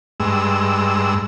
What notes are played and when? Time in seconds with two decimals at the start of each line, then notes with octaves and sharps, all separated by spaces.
0.20 G2 G#3 E6